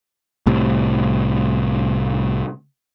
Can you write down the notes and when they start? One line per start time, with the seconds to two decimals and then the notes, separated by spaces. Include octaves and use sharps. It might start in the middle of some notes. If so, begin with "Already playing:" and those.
0.46 C2 A2 C3